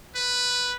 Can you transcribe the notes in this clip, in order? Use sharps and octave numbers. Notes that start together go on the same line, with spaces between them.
B4